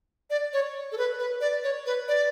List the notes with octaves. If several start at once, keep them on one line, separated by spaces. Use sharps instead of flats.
D5
C#5
A4
B4
B4
D5
C#5
B4
D5